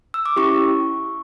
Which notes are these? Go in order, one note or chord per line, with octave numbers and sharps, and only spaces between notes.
E6
D6
C#4 E4 G4 C#6